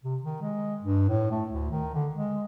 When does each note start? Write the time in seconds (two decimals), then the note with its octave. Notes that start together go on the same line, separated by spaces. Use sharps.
0.04 C3
0.23 D#3
0.42 G#3
0.81 G2
1.09 A2
1.31 A3
1.50 D2
1.71 D#3
1.94 D3
2.14 G#3